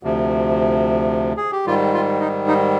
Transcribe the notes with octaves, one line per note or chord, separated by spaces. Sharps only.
D2 C3 F3
G#4
G4
G#2 D#3 G3 F4
F4
D#4
D#4